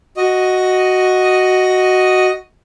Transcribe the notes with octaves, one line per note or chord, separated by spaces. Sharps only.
F#4 D#5